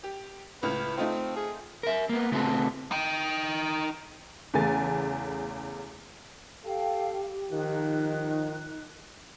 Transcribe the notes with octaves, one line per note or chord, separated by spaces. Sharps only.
G4
C#2 A2 B4 F6
A3 C4 D#4 F4
G#4
A#4 E5
A#3 B3
C#3 A3 B3 C4 F#4 A4
D#4 G5
E2 C#3 A3 G#5 A6
G4 A4 F5 G5
D#3 F3 D#4 F#6